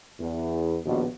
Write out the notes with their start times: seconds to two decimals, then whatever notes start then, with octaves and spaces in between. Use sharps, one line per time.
0.19 E2
0.84 A#1 D#2 B2